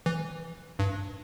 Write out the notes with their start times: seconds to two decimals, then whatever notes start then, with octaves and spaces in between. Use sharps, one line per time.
0.06 E3
0.79 G2